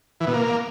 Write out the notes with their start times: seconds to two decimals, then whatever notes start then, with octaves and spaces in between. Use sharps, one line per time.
0.20 E3
0.27 B2
0.34 A#3